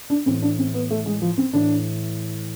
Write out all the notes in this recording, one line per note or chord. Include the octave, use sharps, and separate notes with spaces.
D4
A2 E3 C4
D4
C4
B3
A3
G#3
F3
C4
A2 E3 D4